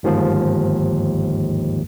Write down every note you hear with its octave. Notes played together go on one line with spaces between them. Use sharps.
G1 D#2 G#2 F3